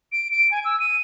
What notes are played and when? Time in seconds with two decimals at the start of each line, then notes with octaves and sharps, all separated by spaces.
0.12 D7
0.31 D7
0.51 G#5
0.65 E6
0.80 D#7